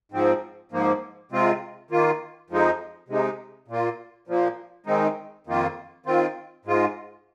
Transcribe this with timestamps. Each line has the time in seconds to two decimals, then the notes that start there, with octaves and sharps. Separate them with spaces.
0.12 G#2 F3 C4
0.72 G#2 F3 A#3
1.32 C3 G#3 C4 F4
1.90 D#3 A#3 F4
2.50 F2 F3 G#3 D#4
3.08 C3 G#3 D#4
3.68 A#2 A#3 F4
4.27 A#2 F3 A#3
4.86 D#3 G#3 C4 D#4
5.47 F2 D#3 A#3 F4
6.06 D#3 C4 F4
6.65 G#2 G#3 F4